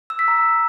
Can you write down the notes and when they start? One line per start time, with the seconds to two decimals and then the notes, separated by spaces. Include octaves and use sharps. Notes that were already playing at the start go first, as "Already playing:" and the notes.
0.10 E6
0.19 B6
0.28 A#5
0.37 E6